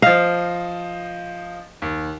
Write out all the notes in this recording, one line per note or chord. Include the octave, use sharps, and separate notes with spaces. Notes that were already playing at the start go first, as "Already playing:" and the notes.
F3 D#5 F5
D#2